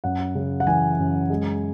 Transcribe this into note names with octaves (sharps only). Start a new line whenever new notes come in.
F#2 F#5
C#3
F#5
E3 G#5
F#2
G#3